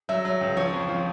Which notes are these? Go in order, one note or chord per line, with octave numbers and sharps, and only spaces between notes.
F#3 E5
F#3
C#2
F3 C#5
F2
F3